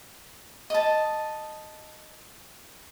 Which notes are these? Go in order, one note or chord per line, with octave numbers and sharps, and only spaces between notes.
D#5 A5